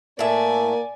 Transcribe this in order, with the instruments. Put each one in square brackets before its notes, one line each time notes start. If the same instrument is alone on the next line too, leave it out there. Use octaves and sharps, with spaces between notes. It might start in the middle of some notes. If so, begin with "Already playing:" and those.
[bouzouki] A2 E5 [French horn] A#3 [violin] D5 G#5